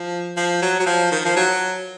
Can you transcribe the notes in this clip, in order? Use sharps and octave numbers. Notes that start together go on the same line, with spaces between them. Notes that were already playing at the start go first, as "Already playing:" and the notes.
Already playing: F3
F3
F#3
F#3
F3
D#3
F3
F#3